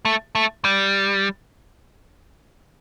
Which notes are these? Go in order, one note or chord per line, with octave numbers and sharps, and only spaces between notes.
A3
A3
G3